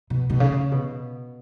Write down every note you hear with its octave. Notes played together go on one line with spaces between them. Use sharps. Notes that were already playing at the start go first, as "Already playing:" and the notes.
B2
B2
C#3
B2